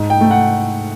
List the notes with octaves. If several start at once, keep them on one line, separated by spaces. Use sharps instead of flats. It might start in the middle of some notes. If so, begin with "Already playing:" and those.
Already playing: G#2
G5
A3
F#5